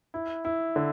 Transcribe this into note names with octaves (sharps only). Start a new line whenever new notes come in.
E4
E4
D3